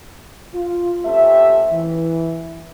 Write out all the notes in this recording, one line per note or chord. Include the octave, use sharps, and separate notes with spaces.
F4
A3 C4 C#4 G4 E5
E3